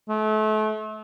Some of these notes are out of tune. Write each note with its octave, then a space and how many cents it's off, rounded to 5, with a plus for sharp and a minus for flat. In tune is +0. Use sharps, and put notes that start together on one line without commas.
A3 -35